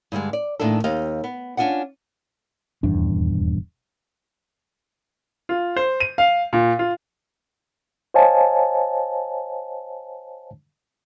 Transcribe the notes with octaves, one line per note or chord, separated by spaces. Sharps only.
G2 D3 G3 G#3
D5
E2 A2 D#3 A#3 D4 A4
D#2 G4 D#5 F5
B3
C#4 D4 F4 D5 F#5
D#1 E2 G2 D4
F4
C5
D#7
F5
A#2
F4
C5 C#5 D#5 F5 G#5 A5